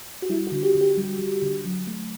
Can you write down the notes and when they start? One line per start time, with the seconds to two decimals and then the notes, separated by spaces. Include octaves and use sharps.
0.22 F#4
0.30 G3 E4
0.47 F#4
0.52 D3
0.63 G4
0.75 D3
0.81 G4
0.98 G3
1.19 G3
1.42 D3
1.65 F#3
1.87 A3